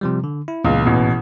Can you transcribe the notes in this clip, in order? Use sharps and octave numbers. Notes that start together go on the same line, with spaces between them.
C3 F3 G3
D3
E4
C#2 A#2 E3 B3
A1 B2